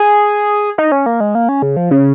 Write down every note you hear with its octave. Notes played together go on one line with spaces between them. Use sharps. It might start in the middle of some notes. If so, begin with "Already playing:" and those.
Already playing: G#4
D#4
C#4
A#3
G#3
A#3
C#4
C#3
F3
C#3